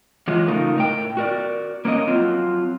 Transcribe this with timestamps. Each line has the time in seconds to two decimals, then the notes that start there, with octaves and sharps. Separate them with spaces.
0.28 E3 F#3 G#3 F4
0.48 C#3 A3 D#4 F4 A#4
0.76 A2 A#4 G5
1.17 F#4 A#4 D5
1.85 A#3 C#4 A#4 D#5
2.07 F#3 C4 F4